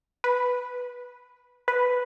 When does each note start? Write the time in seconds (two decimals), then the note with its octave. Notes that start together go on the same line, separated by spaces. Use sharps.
0.24 B4
1.68 B4